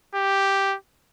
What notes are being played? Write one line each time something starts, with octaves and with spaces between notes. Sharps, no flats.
G4